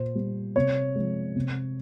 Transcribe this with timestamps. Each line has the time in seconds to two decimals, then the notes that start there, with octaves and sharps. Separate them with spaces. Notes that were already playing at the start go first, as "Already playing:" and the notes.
Already playing: A#2 C5
0.15 G3
0.56 C3 C#5
0.95 F3 G#3
1.36 C3